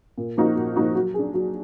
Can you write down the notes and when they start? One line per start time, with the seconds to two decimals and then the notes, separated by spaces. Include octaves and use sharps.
0.18 A#2
0.37 F3 A#3 D#4 F#4
0.56 A#2
0.76 F3 A#3 D#4 F#4
0.95 F#3
1.14 D4 G#4
1.34 F#3